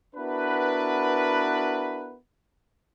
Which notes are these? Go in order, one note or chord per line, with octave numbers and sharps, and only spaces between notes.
B3 D4 E4 F#4 A#4 B4